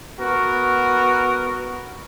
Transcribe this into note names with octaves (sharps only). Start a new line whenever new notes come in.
B3 F#4 A#4